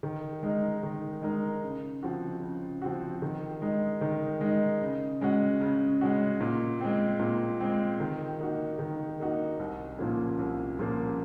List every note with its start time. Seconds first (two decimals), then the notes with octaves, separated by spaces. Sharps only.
0.03 D#3
0.43 G#3 D#4 A#4
0.83 D#3
1.22 G#3 D#4 A#4
1.63 C#3
2.03 F3 C4 F#4
2.42 C#3
2.82 F3 C4 F#4
3.22 D#3
3.62 G#3 D#4
4.01 D#3
4.41 G#3 D#4
4.81 C#3
5.21 G#3 C#4 F#4
5.61 C#3
6.01 G#3 C#4 F#4
6.41 A#2
6.81 G#3 C4
7.20 A#2
7.60 G#3 C4
8.00 D#3
8.40 A#3 D#4 F#4
8.79 D#3
9.20 A#3 D#4 F#4
9.59 C2
9.98 A#2 F3 A#3 C#4
10.39 C2
10.79 A#2 F3 A#3 C#4